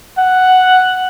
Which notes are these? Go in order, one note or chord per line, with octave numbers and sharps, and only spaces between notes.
F#5